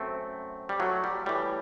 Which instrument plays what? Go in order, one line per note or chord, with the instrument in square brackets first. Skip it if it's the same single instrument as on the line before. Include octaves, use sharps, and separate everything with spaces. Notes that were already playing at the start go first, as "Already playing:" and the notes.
Already playing: [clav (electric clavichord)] F#2 A3 C4
G3
F#3 A3
G3
A2 E3 G3